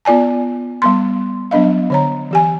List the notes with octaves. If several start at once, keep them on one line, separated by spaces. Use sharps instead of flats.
B3 F4 D5 G#5 A5
G3 B3 C6
F#3 B3 D4 D#5 F5
D3 C#5 A#5
E3 G4 G#5